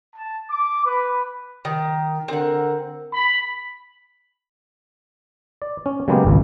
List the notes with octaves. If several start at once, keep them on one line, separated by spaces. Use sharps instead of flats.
A5
D6
B4
D#3
D3 C4 A#4 F#5
B5
D5
C#4
C#3 F#3 G#3 A#3 B3 G4
G#1 C#2